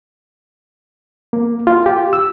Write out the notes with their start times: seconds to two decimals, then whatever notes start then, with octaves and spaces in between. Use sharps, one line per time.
1.33 A#3
1.67 F4
1.86 G4
2.13 E6